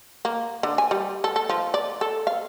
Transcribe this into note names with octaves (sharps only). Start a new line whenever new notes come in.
A#3
D3
G#5
G3
A4
A4
F3
D5
A4
F5